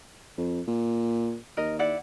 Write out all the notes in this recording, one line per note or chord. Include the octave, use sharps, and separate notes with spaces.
F2
A#2
D#2 A#4 D#5
E4 D5 F#5